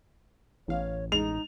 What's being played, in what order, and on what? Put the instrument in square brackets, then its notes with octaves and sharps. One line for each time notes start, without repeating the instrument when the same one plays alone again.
[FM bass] A1 [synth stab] E2 F5 [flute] C#5
[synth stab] G#3 [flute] D#4 [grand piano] F7